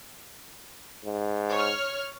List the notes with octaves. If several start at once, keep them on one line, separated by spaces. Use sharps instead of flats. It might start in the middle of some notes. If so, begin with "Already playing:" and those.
G#2
C#5 F6